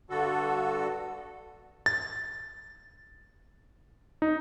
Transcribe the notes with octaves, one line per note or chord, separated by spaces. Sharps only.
G2 D3 F#4 A4
A6
D#4